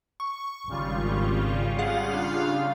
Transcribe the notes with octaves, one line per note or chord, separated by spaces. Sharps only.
C#6
G#1 C#3 G3 F4
G#4 F5 F#5
D4 F5